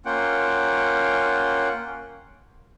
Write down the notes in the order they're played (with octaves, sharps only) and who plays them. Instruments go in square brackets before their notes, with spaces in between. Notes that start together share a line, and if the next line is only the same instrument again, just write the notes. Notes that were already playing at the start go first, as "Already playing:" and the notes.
[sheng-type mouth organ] A#3 C#4 F4 F#5 G5